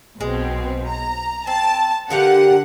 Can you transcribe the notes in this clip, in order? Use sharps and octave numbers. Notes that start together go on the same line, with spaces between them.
B1 B2 G#3 C4
A#5
C4 A5
D3 G4 A#4 F5 F#5